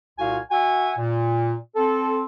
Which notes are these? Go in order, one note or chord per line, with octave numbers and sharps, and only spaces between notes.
C2 A#2 F#4 F5 G#5
F#4 E5 F#5 G#5
A#2
C4 A4